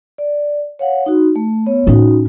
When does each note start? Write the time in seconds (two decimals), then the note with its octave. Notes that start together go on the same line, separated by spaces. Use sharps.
0.18 D5
0.79 C#5 F5 F#5
1.06 D#4 F#4
1.36 A3
1.66 B3 C#5
1.87 A2 C#4 D#4 F#4